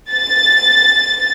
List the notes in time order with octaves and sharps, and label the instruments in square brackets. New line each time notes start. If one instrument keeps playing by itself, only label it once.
[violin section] A6